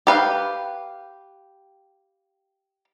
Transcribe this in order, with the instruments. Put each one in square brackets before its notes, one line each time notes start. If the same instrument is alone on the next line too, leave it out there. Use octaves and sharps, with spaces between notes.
[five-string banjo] G4 B4 F5